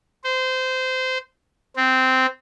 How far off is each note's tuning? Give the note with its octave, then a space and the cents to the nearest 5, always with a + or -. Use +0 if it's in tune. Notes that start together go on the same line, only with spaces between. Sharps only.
C5 -20
C4 -10